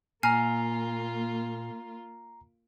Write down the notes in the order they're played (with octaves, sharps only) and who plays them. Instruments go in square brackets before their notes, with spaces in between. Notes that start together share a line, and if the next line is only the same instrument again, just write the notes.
[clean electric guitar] A#2 [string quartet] A#3 F4 [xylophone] G#5 F6 [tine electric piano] A#5 C7